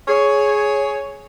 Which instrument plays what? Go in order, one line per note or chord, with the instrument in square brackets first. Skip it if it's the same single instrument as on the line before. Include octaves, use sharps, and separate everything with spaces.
[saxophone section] G#4 C#5